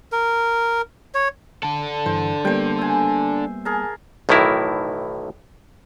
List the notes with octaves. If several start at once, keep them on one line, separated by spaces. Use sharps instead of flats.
A#4
C#5
D4 A4
G2 E3 C5
G3 A#3 B3 C5 G5
E5 G#5
G#4 A#4 A5
B1 A2 D#3 E3 E4 A#4